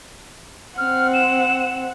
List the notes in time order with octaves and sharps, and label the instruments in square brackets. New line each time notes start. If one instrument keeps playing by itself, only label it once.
[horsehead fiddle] C4 F#5 [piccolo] F6
[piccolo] E7